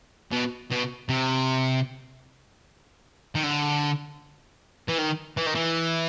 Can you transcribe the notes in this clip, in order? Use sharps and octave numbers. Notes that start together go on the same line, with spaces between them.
B2
B2
C3
D#3
D3
E3
D#3
E3
D#3
E3